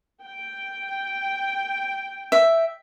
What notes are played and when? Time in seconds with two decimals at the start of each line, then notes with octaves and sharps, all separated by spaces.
0.23 G5
2.32 E5